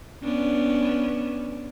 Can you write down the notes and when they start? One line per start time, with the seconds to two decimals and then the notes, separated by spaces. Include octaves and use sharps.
0.24 B3 C#4 D4